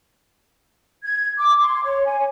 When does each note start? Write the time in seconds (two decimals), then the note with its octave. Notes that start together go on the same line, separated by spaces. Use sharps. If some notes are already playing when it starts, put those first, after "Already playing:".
1.04 G#6
1.39 D6
1.58 C6
1.84 C#5
2.06 G#5